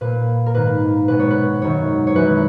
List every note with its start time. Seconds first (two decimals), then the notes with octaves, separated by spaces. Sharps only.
0.01 A#2 A#3 B4
0.46 A#4
0.55 G#2 D#3 A#3 B4
1.08 B2 G#3 B3 B4
1.19 C#5
1.30 B4
1.62 F#2 D#3 F#3 C#5
2.07 C#5
2.15 F#2 E3 G#3 B4